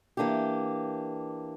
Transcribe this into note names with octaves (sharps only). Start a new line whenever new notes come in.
E3 A#3 D4 G4